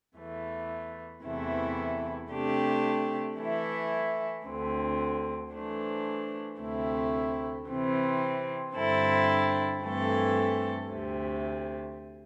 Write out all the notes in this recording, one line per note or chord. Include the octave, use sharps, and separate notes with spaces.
E2 E3 A3
E2 C3 E3 A3 E4
C3 A3 D4 G4
E3 A3 E4
D2 D3 C4
E3 A3 D4 C5
D2 C3 A3 C4 E4
C3 E3 C4
G2 D3 C4 E4 A4
G2 E3 A3 C4 A4
D2 C3 A3